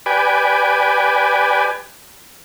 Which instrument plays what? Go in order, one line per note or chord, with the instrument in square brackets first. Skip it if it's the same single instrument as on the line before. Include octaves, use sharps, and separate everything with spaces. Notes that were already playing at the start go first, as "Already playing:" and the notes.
[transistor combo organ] G4 B4 D5 G#5